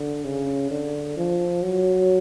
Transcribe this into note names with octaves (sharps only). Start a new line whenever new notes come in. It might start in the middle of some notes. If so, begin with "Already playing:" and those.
Already playing: D3
C#3
D3
F3
F#3